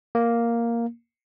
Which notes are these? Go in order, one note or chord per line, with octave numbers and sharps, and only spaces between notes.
A#3